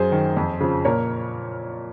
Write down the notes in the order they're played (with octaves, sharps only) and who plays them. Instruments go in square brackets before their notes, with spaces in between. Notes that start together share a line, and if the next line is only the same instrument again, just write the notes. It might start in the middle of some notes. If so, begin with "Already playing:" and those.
Already playing: [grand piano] F#2 G#4 C5
D#3
F2
C#3 F3
A#2 A#4 C#5